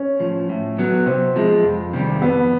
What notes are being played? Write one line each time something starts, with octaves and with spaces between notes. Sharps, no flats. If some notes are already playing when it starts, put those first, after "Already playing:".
Already playing: C#4
A2 F3
A2
F#3 B3
C3 C4
F3 G#3
F2
C3 D#3 G3
F2 B3